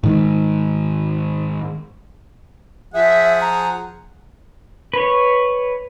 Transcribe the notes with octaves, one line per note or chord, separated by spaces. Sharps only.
G#2 D#3 G#3
F3 G#4 E5 F#5
A#5
B4 C#5